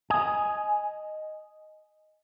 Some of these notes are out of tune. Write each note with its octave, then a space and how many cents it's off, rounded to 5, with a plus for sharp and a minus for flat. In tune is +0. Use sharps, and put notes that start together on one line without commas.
D#5 +0 G#5 +5